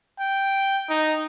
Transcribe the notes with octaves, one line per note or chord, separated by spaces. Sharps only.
G5
D#4